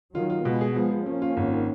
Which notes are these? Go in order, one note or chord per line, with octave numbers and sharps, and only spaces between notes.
D#3 F#3 F4
F4
B2 G#3 B3
G#4
F3 G#3 B3
F3
F3 A#3 C#4
F4
G#1
D#3